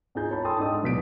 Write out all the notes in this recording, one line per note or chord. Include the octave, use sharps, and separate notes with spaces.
G#2 D#4 F4 G#4 A#5 G6
C#5 A5 B5
A4 G5 A5 C6 D#6 E6
G#2 G#3 D4 D#5 D#6
D1 B2 B6 D7